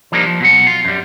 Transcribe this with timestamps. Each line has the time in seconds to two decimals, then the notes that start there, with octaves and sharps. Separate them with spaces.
0.12 F3 G3 A#3 D4 D#4
0.25 F3
0.40 B2 F#3 F#5
0.67 F4
0.85 F#2 G3